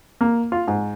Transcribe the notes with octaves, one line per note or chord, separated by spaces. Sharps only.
A#3
F4
G#2